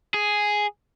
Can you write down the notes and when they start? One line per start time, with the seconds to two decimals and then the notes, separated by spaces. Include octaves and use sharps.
0.14 G#4